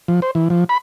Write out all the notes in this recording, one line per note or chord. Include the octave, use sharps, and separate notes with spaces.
F3
C5
E3
F3
B5